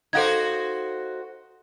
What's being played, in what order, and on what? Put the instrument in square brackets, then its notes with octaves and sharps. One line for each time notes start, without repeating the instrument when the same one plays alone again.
[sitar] D#4 F#4 C5 [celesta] A4 F5 G#6